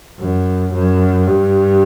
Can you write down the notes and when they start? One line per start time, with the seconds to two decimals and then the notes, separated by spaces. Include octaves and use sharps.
0.20 F#2
0.73 F#2
1.27 G2